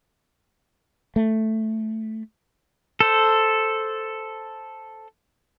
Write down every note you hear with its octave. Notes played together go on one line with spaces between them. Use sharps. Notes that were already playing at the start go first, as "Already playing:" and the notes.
A3
A4 C5